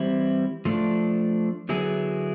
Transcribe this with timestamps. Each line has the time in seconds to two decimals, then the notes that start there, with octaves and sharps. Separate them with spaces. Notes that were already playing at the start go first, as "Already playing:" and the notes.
Already playing: E3 G3 C4 E4
0.65 F3 A3 D4
1.69 D3 F#3 B3 E4 G#4